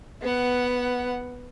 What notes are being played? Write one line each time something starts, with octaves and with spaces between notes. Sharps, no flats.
B3 F#5